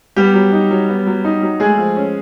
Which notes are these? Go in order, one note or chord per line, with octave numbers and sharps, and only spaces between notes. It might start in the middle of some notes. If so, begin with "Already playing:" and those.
G3 B3 G4
F#3
D#4
F#3
B3
F#3
D#4
F#3
G#3 A3 G#4
F3
C#4